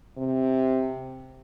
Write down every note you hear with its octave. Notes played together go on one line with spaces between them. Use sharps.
C3